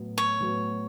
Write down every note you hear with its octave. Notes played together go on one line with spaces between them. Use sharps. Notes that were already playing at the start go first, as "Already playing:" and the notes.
Already playing: A2 F#3 B3
C#5
A2 F#3 B3